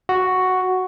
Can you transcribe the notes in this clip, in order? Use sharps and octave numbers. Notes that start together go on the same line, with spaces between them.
F#4